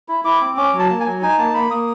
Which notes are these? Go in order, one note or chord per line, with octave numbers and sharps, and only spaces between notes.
E4
E4 D6
C4
C#4 D6
F#3
A5
A#3
G#5
F#3
D#4 G#5
A#3 A5
A#3 B5
A#3 D#6